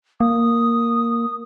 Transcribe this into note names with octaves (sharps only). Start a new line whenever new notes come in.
A#3 D#6